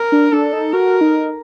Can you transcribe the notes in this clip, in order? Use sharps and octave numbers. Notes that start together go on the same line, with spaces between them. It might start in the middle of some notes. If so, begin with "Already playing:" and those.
Already playing: A#4
D4
D4 A4
D#4
F#4 A#4
D#4